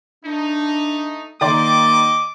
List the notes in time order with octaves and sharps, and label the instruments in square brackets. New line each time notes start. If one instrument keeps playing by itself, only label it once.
[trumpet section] A3 D#4 [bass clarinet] D4
[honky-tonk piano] D#3 D5 C6 [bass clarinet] A#3 [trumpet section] D#5 D6